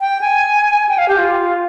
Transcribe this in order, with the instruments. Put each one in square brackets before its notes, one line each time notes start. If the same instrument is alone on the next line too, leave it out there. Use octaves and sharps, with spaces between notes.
[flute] G5
G#5
G5
F5
G4
F4